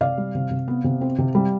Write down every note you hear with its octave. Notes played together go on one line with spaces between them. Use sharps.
C3 D5 F5
G3
C3
C3
B3
C3
C4
C3
G3